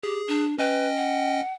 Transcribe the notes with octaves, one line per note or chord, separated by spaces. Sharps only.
G4 G#4
D4
C#4 B4 D#5 G5
F#5